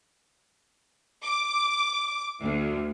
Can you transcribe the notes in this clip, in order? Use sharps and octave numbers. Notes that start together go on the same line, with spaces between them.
D6
D2